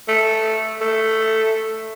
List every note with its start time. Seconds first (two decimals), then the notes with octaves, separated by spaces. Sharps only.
0.09 A3
0.81 A3